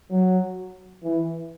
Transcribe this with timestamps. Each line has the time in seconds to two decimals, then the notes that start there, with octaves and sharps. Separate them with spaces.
0.11 F#3
1.04 E3